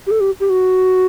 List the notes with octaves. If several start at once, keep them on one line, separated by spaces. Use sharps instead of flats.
G4
A4
G4
G4
F#4